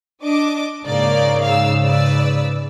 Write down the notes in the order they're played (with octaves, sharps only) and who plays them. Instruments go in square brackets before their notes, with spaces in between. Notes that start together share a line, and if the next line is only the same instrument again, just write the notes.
[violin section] D4 D#5 D6
[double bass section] G#2 C#3 [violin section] A#3 A#4 D5
[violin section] F5 E6
B4 D5 E6